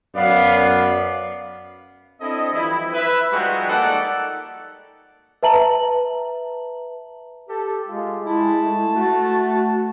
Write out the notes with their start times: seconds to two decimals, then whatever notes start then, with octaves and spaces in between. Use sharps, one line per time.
0.15 F#2 B3 D5 F5
2.21 C4 D4 E4 A4 D#5
2.53 E3 F3 G3 E4
2.93 B4 E5
3.30 F3 G3 G#3 D#4 F#4 G4
3.68 A#3 D#4 A4 D5 F#5
5.43 B4 E5 A5 A#5 F#7
7.49 G4 A4
7.88 G#3 F4
8.26 G#3 E4 A5
8.59 A3
8.95 A3 F#4